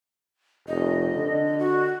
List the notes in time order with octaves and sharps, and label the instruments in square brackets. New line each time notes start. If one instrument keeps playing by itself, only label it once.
[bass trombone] F1 [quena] D#5
[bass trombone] D3
[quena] F#4